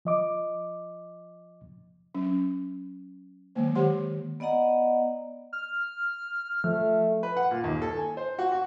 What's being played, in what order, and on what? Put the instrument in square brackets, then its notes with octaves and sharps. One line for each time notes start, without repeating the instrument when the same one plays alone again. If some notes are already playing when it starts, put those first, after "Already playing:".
[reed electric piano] F3 D#5 D6
[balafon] F#3 C#4
D#3 F#3 G#3 A#3 C5
D#3 G4 C5 F#5 C6
[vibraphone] B3 D5 D#5 F#5 A#5
[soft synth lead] F6
[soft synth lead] F3 [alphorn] A3
[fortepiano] B4
F#5
A#2
D#2
A4
G#5
C5
F#4
F#4